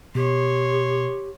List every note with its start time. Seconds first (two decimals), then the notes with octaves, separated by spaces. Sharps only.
0.15 B2 G4 C#5 C6